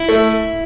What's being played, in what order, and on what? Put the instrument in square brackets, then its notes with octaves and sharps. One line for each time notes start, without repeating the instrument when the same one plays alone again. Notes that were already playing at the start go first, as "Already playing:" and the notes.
Already playing: [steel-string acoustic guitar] E4
[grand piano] A3